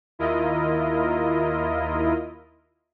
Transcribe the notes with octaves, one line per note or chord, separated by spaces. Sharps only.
D#2 E4 F4 A#4 D#5